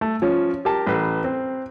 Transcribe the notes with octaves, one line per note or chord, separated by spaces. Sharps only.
A3
F3 C#4
G4 A#4 A5
A1 B4
C4